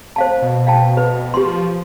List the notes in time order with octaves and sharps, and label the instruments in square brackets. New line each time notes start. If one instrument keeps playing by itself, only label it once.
[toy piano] C5 F5 A5
[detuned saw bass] B2
[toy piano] F5 G5 A5
B4
[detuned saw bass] F3 [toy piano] G4 C6